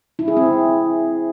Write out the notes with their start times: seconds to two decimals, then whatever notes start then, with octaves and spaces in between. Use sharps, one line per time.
0.19 E4
0.28 G#4
0.37 C4